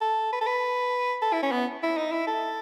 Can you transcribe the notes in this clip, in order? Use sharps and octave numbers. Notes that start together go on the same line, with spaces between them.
A4
B4
A4
B4
A4
E4
C#4
B3
E4
D#4
E4
A4